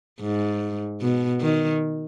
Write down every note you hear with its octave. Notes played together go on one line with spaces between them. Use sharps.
G#2
B2
D#3